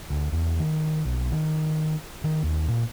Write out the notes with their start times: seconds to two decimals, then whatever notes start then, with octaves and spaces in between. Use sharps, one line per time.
0.10 D2
0.32 E2
0.59 D#3
1.05 B1
1.31 D#3
2.24 D#3
2.43 D#2
2.68 A#2